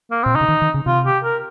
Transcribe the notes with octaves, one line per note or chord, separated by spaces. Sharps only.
A#3
A#2 C4
C3 D#4
C#3
D#3
D#3
C#3
C3 F4
G4
A#4